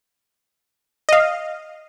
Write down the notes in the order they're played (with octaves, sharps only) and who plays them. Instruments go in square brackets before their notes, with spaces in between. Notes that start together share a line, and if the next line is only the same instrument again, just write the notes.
[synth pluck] D#5 F5